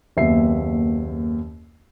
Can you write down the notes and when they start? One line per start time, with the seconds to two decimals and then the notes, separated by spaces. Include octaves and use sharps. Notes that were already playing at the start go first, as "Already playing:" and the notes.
0.17 F#1 D#2 B3 E5 C7